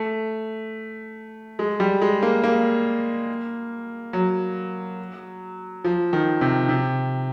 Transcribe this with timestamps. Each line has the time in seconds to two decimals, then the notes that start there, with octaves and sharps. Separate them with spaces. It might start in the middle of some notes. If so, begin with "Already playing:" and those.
Already playing: A3
1.59 G#3
1.80 G3
2.01 G#3
2.23 A#3
2.44 A#3
4.13 F#3
5.84 F3
6.13 D#3
6.41 C3
6.69 C3